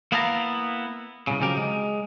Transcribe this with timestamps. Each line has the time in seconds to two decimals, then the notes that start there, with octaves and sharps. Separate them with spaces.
0.12 A#3 B3 E4 F5 A5 A#5
1.27 C2 C#3
1.41 C#3 F3 F#3 G4 A#4
1.57 G#3